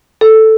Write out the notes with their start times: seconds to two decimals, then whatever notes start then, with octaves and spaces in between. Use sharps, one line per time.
0.21 A4